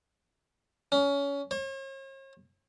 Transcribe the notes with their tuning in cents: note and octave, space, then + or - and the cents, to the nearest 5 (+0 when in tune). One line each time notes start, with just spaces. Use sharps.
C#4 +25
C#5 -45